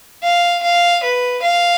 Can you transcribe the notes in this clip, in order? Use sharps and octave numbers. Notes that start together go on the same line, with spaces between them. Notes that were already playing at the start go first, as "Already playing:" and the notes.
F5
F5
B4
F5